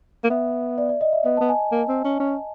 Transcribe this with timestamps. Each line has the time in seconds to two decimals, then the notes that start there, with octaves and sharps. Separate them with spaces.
0.24 A#3
0.30 B3 E5
0.78 D5
0.89 D5
1.01 D#5
1.13 E5
1.25 B3 D#5
1.37 A5
1.41 B3
1.49 G#5
1.72 A#3
1.89 C4
2.05 C#4
2.20 C#4